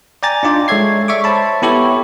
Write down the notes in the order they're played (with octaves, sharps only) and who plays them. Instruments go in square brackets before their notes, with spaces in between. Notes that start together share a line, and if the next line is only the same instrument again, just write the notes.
[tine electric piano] D5 G5 G#5 A#5 A6
D4 D#4 F4 D5 G5
G#3 A4 C#5 E5 G#6 C7
D5 E5 C#6 D6
C5 C#5 E5 A5 B5
B3 E4 G4 A4 C#5